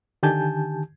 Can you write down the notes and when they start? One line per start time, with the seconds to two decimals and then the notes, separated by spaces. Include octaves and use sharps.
0.23 D3 D#3 G4 G#5 A5 G6